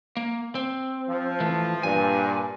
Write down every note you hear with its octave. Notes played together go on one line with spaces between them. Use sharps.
A#3
C4
F3
E3 A3
G2 A#2 G#5